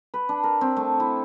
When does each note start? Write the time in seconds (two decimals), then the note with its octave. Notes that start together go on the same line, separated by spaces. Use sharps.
0.14 B4
0.29 D4
0.44 A#4
0.61 C4
0.77 A3
1.00 E4